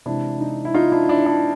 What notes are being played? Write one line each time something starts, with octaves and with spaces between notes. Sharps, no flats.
C3 E3 G#3 D4 E4
D#4
E4
D#4 F4
D4 E4
D4 E4
D4 E4